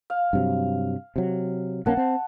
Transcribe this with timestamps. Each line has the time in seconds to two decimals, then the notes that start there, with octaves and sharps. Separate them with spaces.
0.10 F5
0.33 G2 C3 F#3
1.16 C3 F#3
1.86 B1 A#3 C#4 F#5 A5
1.97 C4